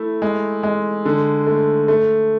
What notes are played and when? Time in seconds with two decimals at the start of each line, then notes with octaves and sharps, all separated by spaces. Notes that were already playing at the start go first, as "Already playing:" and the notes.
Already playing: A3 E4
0.22 G#3
0.63 G#3
1.05 D3
1.47 A3
1.88 A3